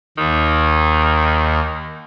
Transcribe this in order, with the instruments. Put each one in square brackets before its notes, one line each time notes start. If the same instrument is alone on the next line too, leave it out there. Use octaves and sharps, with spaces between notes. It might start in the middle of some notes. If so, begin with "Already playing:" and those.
[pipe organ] D#2 [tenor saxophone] D#3